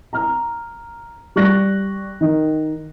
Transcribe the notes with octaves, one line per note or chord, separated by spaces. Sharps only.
A#5 F6
G3 C#6 F#6 A#6
D#3